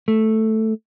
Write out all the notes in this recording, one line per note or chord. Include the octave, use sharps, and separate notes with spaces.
A3